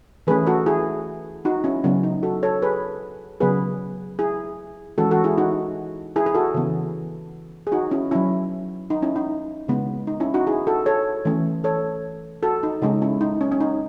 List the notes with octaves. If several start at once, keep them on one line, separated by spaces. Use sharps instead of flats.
E3 A3 C#4 G#4 B4
F#4 A4
E4 G#4
D#4 F#4
C#4 E4
C#3 F#3 B3 C#4
D#4
F#4 A4
A4 C#5
G#4 B4
C#3 F#3 B3 G#4 B4
E4 G#4
E3 G#3 C#4 F#4 A4
F#4 A4
E4 G#4
D#4 F#4
E4 G#4
G#4
F#4 A4
C#3 E3 B3
G#4
D#4 F#4
C#4 E4
F#3 C#4 E4
D#4
C#4 E4
D#4
C#3 G#3 B3
D#4
C#4 E4
D#4 F#4
E4 G#4
F#4 A4
A4 C#5
E3 A3 C#4
A4 C#5
F#4 A4
D#4
C#3 G#3 C#4 D#4
C#4 E4
D#4
C#4
C#4
D#4